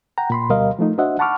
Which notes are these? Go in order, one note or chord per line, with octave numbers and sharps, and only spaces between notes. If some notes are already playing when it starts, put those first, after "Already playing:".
F#5 G5 A#5
A#2 B5 C6
D2 B2 G3 A#4 D#5 F5
F3 A3 D#4
D4 F#4 C5 D#5 E5 F#5
F#5 A5 B5 C#6 D6 F6